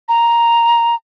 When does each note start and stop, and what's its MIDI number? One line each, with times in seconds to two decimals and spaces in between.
0.09 0.95 82